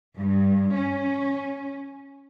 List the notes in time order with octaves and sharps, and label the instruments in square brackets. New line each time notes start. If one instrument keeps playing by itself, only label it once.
[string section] G2
C#4